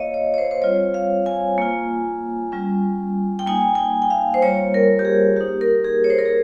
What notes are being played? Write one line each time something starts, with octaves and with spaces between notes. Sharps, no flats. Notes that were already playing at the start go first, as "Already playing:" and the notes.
Already playing: A#3 F4 C#5 D#5 F5
C#5
C#5
C5
C5
G3 C4 F4 C#5
F5
G#5
A#3 F4
G3 C#4 F4
G5
A#3 D#4 G#5
G#5
G5
G5
F5
C5
G3 A#3 F4 C#5
A#4
G4
G#4
A#3 D#4 G4
A#4
G#4
C#5
C5
A#4
G#4